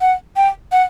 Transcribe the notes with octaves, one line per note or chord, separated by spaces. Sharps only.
F#5
G5
F#5